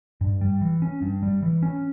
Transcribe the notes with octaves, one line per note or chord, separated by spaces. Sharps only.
G2
G3
E3
C#4
G2
G3
E3
C#4